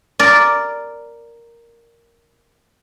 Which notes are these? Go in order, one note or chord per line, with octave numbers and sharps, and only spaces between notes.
A#4 D5